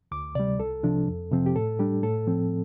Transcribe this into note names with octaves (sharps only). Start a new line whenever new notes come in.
D2 D6
C3 G3 D5
C2 A4
C3 F3 D4
F2
C3 F3 C4
G4
A2 A4
G3 D4 G4
A2 A4
F3 C4